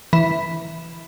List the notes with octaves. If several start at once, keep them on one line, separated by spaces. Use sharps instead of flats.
E3